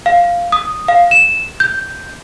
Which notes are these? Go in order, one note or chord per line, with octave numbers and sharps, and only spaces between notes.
F5
D#6
F5
E7
G6